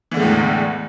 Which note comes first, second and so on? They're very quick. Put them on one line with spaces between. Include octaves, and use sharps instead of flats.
E3 D3 G#3 A2 E2